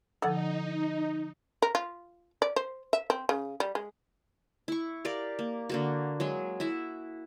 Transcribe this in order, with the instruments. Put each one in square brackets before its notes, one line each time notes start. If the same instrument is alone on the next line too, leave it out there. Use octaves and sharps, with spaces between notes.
[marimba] D3 F3 A6 [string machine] D#4 [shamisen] A4 D5 F#5
[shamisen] A#4
F4
D5
C5
E5
C4
C#3
G3
G#3
[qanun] E4 C#6
G4 A#4 D5 F5
A#3
D3 A#3 F#4
F#3 G#3 G#4
E4 F#4 E5